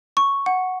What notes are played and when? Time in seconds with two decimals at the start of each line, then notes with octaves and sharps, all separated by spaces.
0.17 C#6
0.46 F#5